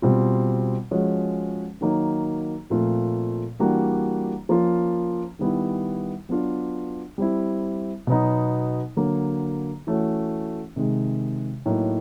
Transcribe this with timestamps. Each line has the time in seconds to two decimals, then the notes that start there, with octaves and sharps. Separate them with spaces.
0.02 B2 G3 C4 F4
0.91 F3 G#3 C#4 F#4
1.81 D#3 F#3 A#3 D#4
2.70 A#2 F3 A3 C4 F4
3.59 E3 G3 A#3 D4 F#4
4.49 F3 A#3 C#4 F4
5.39 D#3 G3 B3 E4
6.29 F#3 B3 D4 F4
7.18 G3 C4 E4
8.07 B2 F#3 B3 D#4
8.97 D3 F#3 A#3
9.87 E3 A3 C#4 F#4
10.76 C3 D#3 G#3
11.66 A2 F#3 A#3 D#4